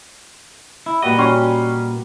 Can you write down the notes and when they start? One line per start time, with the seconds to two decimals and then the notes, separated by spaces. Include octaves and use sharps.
0.86 E4
1.02 A#2 G3 F#4 B4 D#5
1.18 G3 C#4 C6